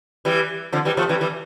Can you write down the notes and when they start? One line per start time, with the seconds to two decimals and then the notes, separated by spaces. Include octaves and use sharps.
0.25 E3 G3
0.72 D3 F3
0.85 E3 G3
0.97 F3 A3
1.09 E3 G3
1.21 E3 G3